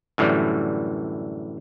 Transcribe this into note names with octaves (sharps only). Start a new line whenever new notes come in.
F#2 A2 D3 E3 G3